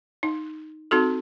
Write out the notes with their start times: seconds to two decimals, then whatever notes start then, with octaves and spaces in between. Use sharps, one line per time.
0.23 D#4
0.91 C4 D#4 F#4 A4